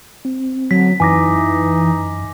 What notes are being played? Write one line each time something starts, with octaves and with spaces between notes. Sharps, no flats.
C4
D3 F#3 B6
F#2 E3 D#4 G#5 D6 A#6